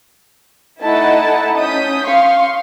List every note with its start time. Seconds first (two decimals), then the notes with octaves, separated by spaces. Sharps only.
0.83 A3 D#4 E4 D#5 F#5 A5
1.57 C#4 D#6 G6 B6
2.05 F5 C6 C#6